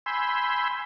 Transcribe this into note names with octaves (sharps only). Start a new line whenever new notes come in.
G#5 B5 C6 E6 G6